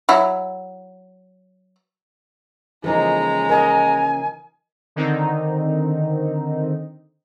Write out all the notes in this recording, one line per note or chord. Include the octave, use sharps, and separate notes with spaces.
F#3 E4
C#3 E3 F3 G#3 A#3 D#4 A4 A#5
A#4 D#5 G#5
D3 D#3 C4 D#4